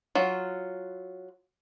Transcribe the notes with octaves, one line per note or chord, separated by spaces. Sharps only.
F#3 F4